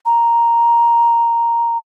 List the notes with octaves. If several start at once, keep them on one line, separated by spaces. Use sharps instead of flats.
A#5